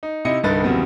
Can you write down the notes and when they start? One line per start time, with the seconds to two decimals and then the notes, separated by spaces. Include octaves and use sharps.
0.03 D#4
0.25 C3 D#4 E4 D#5 C#7
0.43 C2 G2 D3 D#4 B4 A6
0.64 E2 C#3 F#3 G3 B3 C4